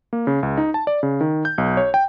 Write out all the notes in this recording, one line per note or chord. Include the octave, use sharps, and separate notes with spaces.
A#3
C#3
C#2
D#4
A5
D5
C#3
D#3
G6
B1
C#5
G5